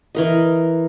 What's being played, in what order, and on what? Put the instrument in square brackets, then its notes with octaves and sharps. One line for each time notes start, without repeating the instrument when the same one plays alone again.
[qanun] E3 A#4 D#5